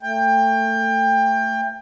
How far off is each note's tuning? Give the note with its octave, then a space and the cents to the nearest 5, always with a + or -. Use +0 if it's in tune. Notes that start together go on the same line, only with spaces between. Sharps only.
A3 +20 G5 +25